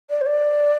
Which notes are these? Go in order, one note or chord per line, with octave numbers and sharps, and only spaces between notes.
D5
C5
D5